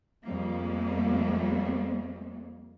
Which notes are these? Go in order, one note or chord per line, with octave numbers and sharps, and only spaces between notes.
F2 G3 G#3 A#3